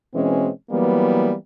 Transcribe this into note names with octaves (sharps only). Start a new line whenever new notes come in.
B2 E3 G#3 C4 C#4
E3 F#3 G3 A#3 B3